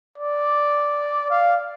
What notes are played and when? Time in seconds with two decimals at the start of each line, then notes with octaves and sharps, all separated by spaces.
0.18 D5
1.30 F5